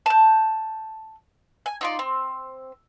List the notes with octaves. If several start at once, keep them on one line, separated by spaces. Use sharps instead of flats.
A5 G6
G#5
D#4 F4 D5
C4